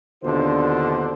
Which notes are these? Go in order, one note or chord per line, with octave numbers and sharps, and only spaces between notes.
D#2 B2 D3 D4 F4 C5